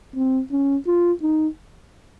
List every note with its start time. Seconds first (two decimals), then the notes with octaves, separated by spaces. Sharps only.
0.16 C4
0.51 C#4
0.87 F4
1.23 D#4